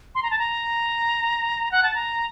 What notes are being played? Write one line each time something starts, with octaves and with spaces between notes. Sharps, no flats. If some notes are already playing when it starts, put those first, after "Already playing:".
C6
A#5
A5
A#5
F#5
A5
A#5